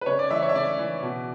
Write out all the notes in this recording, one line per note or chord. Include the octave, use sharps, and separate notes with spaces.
B4
C#3 C#5
D5
E3 E5
C#5
E5
C#3 D5
E3
B2